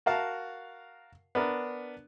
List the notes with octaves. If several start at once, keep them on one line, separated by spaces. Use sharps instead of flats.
F#4 A#4 F5 A5
B3 D4 A#4